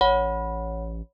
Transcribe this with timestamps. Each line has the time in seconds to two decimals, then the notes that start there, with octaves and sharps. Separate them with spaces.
0.01 A1 C#5 F#5 B5